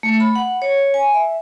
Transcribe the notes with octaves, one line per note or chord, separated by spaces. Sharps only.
A3
B5
F#5
C#5
G#5
E5